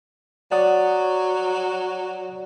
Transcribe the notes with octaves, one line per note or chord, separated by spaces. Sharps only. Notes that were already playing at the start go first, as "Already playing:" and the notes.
F#3 D5 F#5 D#6